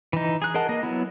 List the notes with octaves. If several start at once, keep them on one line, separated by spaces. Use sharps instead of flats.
E3 D#4
G#4 F#6
G#4 A#4 D#5 F#5 A5
A#3 D#5
F#3 B3 E4